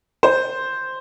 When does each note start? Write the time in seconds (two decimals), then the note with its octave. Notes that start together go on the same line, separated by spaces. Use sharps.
0.23 C5